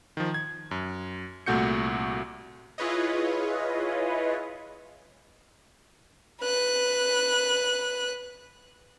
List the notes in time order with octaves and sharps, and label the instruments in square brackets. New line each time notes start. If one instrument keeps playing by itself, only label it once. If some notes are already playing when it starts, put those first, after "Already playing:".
[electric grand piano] D#3 F3
G#6
F#2
C2 A#2 A3 F#4 G6 C#7
[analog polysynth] E4 F4 G#4 B4 C#5 D#5
[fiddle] B4 F#6